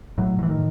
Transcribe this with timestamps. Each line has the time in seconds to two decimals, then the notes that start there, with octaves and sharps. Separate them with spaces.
0.18 A2 F#3
0.39 A2 E3
0.49 D#3